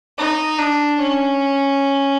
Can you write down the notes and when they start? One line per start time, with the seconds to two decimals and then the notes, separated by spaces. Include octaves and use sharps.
0.18 D#4
0.58 D4
0.99 C#4